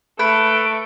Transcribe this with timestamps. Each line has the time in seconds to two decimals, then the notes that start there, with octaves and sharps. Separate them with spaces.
0.19 A3 B4 D7